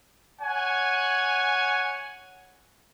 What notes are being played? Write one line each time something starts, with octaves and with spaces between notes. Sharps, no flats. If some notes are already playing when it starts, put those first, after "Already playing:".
C#5 F#5 G#5